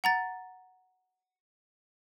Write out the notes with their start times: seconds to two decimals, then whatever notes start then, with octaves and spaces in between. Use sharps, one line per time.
0.04 F#5 A#5 A6